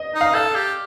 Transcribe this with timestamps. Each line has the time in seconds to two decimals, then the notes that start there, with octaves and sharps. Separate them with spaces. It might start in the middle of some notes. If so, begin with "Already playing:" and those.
Already playing: D#5
0.14 D#4
0.21 F5
0.34 A4 F5
0.55 G4